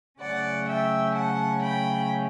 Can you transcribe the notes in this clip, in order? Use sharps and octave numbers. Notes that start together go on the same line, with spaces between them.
C#3 F#3 A3 C#4 D5 F#5
E5 G5
F#5 A5
G5 B5